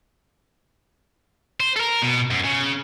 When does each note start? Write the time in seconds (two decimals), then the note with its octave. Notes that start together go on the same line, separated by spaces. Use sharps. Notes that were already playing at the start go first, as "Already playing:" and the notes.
1.60 C5
1.76 A4 A#4
2.02 B2
2.30 F#2
2.44 C#3